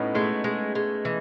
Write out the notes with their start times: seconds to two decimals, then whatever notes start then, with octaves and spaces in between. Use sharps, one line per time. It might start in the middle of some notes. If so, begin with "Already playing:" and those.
Already playing: A2 B3 C#4 D#4 E4
0.15 G#3 A3
0.44 G#3
0.75 G#3
1.05 E3